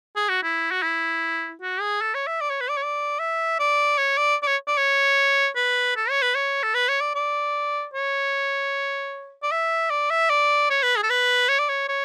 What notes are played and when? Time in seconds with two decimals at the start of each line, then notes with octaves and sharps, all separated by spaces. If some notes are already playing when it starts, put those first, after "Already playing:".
0.16 G#4
0.29 F#4
0.43 E4
0.71 F#4
0.82 E4
1.62 F#4
1.81 G#4
2.01 A4
2.14 C#5
2.27 E5
2.41 D5
2.50 C#5
2.61 B4
2.70 D5
2.77 C#5
2.84 D5
3.19 E5
3.60 D5
3.98 C#5
4.18 D5
4.43 D5
4.47 C#5
4.67 D5
4.78 C#5
5.56 B4
5.96 A4
6.10 C#5
6.22 B4
6.35 C#5
6.63 A4
6.74 B4
6.89 C#5
7.01 D5
7.15 D5
7.94 C#5
9.43 D5
9.52 E5
9.90 D5
10.11 E5
10.30 D5
10.70 C#5
10.83 B4
10.96 G#4
11.03 A4
11.10 B4
11.49 C#5
11.59 D5
11.69 C#5
11.88 C#5